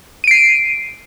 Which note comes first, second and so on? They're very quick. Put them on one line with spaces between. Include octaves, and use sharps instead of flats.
D#7 D7 C7